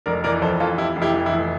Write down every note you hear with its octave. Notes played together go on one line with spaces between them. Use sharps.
F1 A#4 D5
E3 A#4 D5
F2 A4 C5
E3 F4 A4
E3 E4 G4
F1
E4 G4
E3
E4
F1